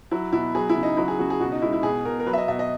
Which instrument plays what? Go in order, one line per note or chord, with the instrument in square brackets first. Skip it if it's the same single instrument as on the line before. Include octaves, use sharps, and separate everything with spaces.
[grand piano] F#3 E4
B2 E4
F#3 G#4
E4
C#3
D#4
F#3 E4
G#4
C#3 F#4
G#4
B2 F#4
D#4
G#3 E4
E4
B2 G#4
B2 A#4
A#4
F#3 B4
E5
D#5
B2 E5
D#5